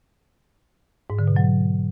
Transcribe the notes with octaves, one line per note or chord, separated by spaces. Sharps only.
G#2
D3
B2
F#3